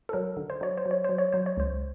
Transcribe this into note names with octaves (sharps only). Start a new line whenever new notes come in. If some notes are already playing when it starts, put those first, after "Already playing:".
A4
F#3 A#4
D3
C5
F#3 C#5
C5
F#3
C#5
F#3 C5
C#5
F#3 C5
C#5
C#2 C5